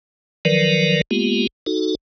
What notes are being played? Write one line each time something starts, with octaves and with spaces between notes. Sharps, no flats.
D#3 F3 F#3 A#4 B4 D5
G#3 A#3 B3 F4 G4
D#4 F#4 A4